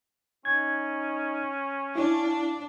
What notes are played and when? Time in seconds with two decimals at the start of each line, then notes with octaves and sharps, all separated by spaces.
0.45 C#4 D#4 G#6
1.95 D4 E4 F5